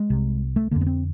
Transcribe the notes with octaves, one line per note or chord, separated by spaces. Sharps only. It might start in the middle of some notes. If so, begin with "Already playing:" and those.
Already playing: G#3
C2 C3
A3
F2 D3 A#3
B3
C4